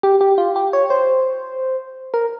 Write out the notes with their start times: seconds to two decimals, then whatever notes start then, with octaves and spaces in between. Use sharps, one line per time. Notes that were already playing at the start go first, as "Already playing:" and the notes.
0.03 G4
0.21 G4
0.38 F4
0.56 G4
0.73 C#5
0.90 C5
2.14 A#4